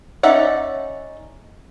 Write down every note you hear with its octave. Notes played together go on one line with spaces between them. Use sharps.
C#4 D#4 D5 E5 F#5